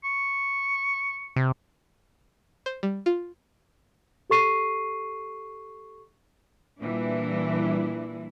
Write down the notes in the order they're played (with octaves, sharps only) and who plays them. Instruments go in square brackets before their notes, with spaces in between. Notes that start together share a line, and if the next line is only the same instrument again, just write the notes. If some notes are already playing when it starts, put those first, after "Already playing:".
[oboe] C#6
[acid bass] C3
[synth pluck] C5
G3
F4
[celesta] G4 A4 C#6 C7 D#7
[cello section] A#2 E3 G3 D4 E4